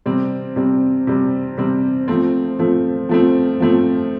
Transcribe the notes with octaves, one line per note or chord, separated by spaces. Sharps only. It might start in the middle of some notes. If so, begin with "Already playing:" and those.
C3 G3 C4
C3 G3 C4
C3 G3 C4
C3 G3 C4
F3 A3 C4
F3 A3 C4
F3 A3 C4
F3 A3 C4